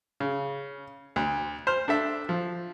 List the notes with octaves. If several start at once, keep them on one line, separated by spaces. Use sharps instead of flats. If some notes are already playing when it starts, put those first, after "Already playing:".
C#3
D2
C5 F6
D4 A4 E5
F3